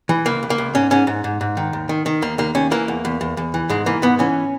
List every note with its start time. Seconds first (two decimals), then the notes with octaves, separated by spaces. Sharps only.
0.09 E3
0.26 C#2 A#3
0.43 C#2
0.50 A#3
0.58 C#2
0.75 G#2 C#4
0.91 G#2 C#4
1.07 G#2
1.24 G#2
1.41 G#2
1.57 D#3
1.73 D#2
1.89 D#3
2.06 D#3
2.22 D#2 A#3
2.38 D#2 A#3
2.55 D#2 C#4
2.71 E3 A#3
2.88 E2
3.05 E2
3.21 E2
3.37 E2
3.54 E3
3.69 G#2 G#3
3.86 E3 A#3
4.02 G#2 B3
4.19 E3 C#4